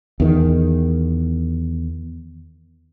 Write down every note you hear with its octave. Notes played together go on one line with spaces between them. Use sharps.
E2 D#3